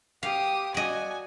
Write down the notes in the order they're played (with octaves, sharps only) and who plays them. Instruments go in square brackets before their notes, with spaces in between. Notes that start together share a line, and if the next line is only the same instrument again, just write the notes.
[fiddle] G4 D#6 [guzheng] F5
[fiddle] F#4 G#5 [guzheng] D5 D#5